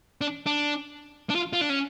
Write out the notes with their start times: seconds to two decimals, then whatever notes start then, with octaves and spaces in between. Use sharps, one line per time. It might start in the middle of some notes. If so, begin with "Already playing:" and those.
0.21 D4
0.46 D4
1.30 D4
1.35 F4
1.53 F4
1.61 D4
1.70 C#4